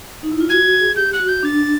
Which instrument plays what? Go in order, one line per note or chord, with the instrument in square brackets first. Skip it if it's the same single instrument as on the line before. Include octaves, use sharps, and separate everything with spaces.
[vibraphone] D#4
E4
F4
[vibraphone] F#4 [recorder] G#6
[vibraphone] F#4
G#4
[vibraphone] G4 [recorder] G6
[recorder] F#6
[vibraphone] F#4
[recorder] G6
[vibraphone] D4 [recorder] A6